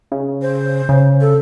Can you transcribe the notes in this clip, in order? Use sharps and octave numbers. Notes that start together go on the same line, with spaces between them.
C#3
C5
C#3
A4